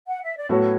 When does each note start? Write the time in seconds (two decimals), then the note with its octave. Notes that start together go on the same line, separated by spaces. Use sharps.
0.07 F#5
0.22 E5
0.36 D5
0.49 A2 F#3 B3 F#4 A4 C#5